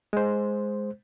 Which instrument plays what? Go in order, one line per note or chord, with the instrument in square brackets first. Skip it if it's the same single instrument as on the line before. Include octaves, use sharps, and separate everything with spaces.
[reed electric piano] G#3 C5